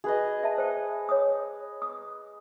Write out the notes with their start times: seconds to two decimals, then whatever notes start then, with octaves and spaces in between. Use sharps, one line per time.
0.04 G#4 B4 D#5
0.43 E5 A5
0.58 C5 G5
1.09 C#5 D#6
1.82 D#6